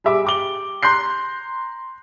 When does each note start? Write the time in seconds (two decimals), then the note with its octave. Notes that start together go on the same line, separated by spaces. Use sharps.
0.04 G3 G#4 E5 D6
0.25 G4 D6 G7
0.83 A#5 C6 F#6 G6 C7